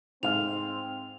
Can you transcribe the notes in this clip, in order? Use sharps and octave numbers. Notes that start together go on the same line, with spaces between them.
G#2 C4 F5 F6 F7